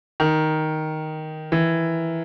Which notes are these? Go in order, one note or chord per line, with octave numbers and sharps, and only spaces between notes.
D#3
E3